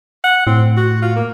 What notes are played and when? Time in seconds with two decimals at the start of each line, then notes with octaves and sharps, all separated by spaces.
0.24 F#5
0.47 A2 C4
0.77 F#4
1.02 F4
1.16 A#3